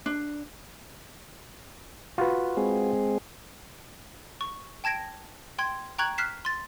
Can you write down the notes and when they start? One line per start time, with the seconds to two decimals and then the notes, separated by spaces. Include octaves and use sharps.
0.06 D4
2.18 F4 F#4 B4
2.57 G#3 C4 G#4
4.41 C#6
4.84 G5 A5 G#6 A#6 D7
5.58 G5 C6 G#6
5.98 G5 A#5 C#6 F#6 G#6 F#7
6.18 F6 F#6 B6 C7 E7
6.45 C6 A6